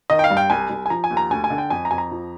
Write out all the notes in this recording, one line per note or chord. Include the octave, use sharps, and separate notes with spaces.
D#3 D#5
G5
F5
G2
G5
C2 G#5
C2
G#5
F3 A#5
G#5
D#2
A#5
D2 G#5
G#5
D3
G5
F2 G#5
A#5
F2 G#5
A#5
F3